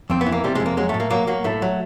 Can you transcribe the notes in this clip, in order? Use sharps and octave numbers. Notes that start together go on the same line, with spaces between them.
F2 C4
B3
E3
A#3
C3 G3
F2 G#3
A#3
F#3 G#3
A2 A3
A#3
F#3 A#3
F#3 A#3
A2 A3
F#3